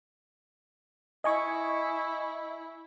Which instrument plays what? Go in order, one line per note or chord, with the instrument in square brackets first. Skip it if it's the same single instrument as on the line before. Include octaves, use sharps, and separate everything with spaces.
[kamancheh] E4 [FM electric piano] D#5 G#5 C#6